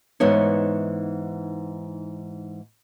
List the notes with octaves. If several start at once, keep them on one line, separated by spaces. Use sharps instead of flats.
G#2 E3 B3 D#4 C#5